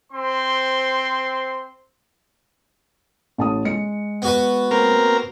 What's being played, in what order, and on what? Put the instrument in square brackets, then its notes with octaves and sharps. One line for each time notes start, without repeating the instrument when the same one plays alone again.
[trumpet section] C4 C5 C6
[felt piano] A1 A5 D#6
G#3 C#7
[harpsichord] B3 F#4 B4
[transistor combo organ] A#3 C4 A#4